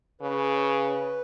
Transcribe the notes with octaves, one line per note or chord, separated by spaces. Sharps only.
C#3 B4